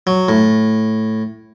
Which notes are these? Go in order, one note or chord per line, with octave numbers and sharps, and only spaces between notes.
F#3
A2